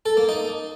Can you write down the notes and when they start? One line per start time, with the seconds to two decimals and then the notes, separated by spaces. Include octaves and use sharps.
0.06 A4
0.17 A#3
0.29 D#4